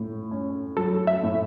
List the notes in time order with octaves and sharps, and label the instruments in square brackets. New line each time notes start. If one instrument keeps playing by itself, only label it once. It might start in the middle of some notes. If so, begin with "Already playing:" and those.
Already playing: [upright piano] A2
C#4
[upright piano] F#3 [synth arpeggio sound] A4
[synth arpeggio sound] E5
[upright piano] A2